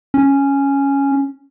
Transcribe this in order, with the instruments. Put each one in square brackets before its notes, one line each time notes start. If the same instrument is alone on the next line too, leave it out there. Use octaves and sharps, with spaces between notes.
[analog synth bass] C#4